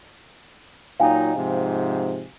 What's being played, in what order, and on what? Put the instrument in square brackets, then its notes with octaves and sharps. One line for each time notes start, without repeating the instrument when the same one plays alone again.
[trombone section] A#2 F#3 D#4 [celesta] F5 G5 G#5
[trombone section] G#2 C3 F3